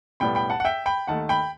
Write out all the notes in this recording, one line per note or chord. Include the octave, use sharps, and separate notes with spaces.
B1 A2 G3 B3 G5 B5
G5 B5
F#5 A5
F#5
E5 G5
G5 B5
D#2 D#3 A3 F#5 A5
G5 B5